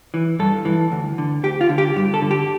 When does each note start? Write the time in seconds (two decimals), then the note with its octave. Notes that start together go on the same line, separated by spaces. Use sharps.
0.14 E3
0.39 G2 A4
0.65 E3
0.92 D2
1.18 D3
1.43 D2 G4
1.61 F4
1.69 D3
1.78 G4
1.96 G2 G4
2.14 A4
2.22 D3
2.31 G4